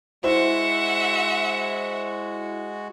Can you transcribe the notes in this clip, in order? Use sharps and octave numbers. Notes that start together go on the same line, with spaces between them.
G#3 E4 F#4 C5 E5 F#5